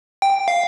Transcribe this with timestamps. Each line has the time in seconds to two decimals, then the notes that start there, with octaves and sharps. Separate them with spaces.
0.22 G5
0.48 F5